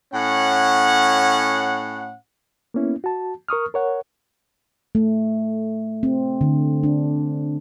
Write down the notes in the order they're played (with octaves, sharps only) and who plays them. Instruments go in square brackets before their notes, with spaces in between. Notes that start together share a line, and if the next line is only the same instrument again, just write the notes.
[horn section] A2 C#4 F#5
[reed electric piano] A#3 B3 C#4 E4
F#4 A5
A#4 C#6 D#6 F6
A#4 C#5 F#5
[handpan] A3
C4
D3
D4